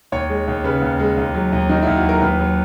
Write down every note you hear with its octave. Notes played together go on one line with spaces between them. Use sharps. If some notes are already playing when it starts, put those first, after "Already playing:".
D#2 C#5
G#3
D#2
C#3 B4
D#2
G#3
D#2
F#3
D#2
D#3 D#4
E4
D#2
F#4
F#3 A#4
A#4
D#2 B4
F#3